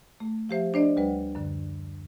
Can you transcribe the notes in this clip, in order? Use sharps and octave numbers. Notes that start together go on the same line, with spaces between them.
A3
F3 G4 C5 E5
D4 C5 D5 D#5
D2 G3 B4 F#5
F#2 D3